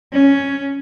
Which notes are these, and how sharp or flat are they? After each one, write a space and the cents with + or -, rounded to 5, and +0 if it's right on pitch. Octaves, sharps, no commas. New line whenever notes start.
C#4 +5